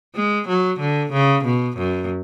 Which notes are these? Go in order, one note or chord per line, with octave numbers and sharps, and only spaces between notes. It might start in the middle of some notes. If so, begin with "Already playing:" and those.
G#3
F#3
D3
C#3
B2
F#2